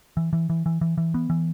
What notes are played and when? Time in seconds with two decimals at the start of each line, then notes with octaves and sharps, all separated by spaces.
0.17 E3
0.33 E3
0.50 E3
0.66 E3
0.81 E3
0.98 E3
1.14 B3
1.30 E3